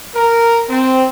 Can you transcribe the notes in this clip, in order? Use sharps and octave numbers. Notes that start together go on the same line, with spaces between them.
A#4
C4